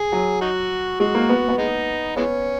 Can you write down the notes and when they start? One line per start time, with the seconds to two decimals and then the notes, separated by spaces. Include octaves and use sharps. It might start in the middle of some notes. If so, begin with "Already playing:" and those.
Already playing: G#4
0.12 F#3
0.41 D#4 F#4
1.00 G#3 F#4
1.15 A#3
1.29 B3
1.49 B3
1.58 G#3 D#4
2.16 E3 G#3 B3 C#4